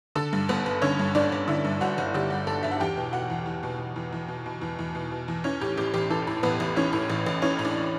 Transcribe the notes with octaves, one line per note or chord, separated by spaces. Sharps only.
D3 A4 A5
G2
G1 B3 B4
G1
D3 C#4 C#5
G2
G1 D4 D5
G1
D3 E4 E5
G2
G1 F#4 F#5
G1
D3 G4
G2
G1 A4
G1 E5
F#5
E2 G4 G5
B2
B2 F#4 F#5
E2
E2
B2
B2
E2
E2
B2
B2
E2
E2
B2
B2
E2
E3 C#4 C#5
A2 G4
A1 G4
A1 G4
E3 A4
A2
A1 B3 B4
A1
E3 C#4 C#5
A2
A1
A1
E3 C#4 C#5
A2
D4 D5